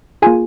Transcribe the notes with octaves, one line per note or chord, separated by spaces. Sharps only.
A#3 F4 G#4 G#5